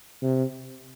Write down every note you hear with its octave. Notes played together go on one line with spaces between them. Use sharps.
C3